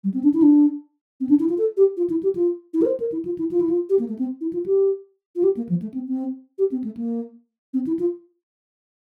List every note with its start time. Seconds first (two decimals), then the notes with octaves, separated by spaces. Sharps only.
0.04 G3
0.14 C4
0.23 D4
0.34 E4
0.42 D4
1.20 C4
1.29 D4
1.40 E4
1.49 F4
1.58 A4
1.77 G4
1.97 F4
2.10 E4
2.23 G4
2.35 F4
2.74 E4
2.82 A#4
2.86 C5
3.00 A#4
3.12 E4
3.25 F4
3.38 E4
3.51 F4
3.61 E4
3.70 F4
3.89 G4
3.99 A#3
4.09 A3
4.19 C4
4.41 E4
4.53 F4
4.66 G4
5.36 F4
5.43 G4
5.57 A#3
5.69 F3
5.82 A3
5.94 C4
6.08 C4
6.58 G4
6.72 C4
6.84 A3
6.97 A#3
7.74 C4
7.87 E4
7.99 F4